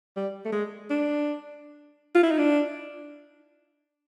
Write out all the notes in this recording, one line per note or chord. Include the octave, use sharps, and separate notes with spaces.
G3
A3
G#3
D4
F4
E4
D#4
D4